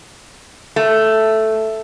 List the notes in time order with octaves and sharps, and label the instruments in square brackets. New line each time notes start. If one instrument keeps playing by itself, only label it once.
[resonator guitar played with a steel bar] A3